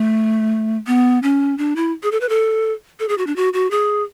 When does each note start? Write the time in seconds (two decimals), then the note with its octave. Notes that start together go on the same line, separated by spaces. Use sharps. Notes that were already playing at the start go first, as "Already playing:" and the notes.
Already playing: A3
0.87 B3
1.23 C#4
1.58 D4
1.76 E4
2.03 G#4
2.12 A4
2.21 B4
2.29 A4
3.00 A4
3.09 G#4
3.18 F#4
3.27 D4
3.36 F#4
3.53 F#4
3.71 G#4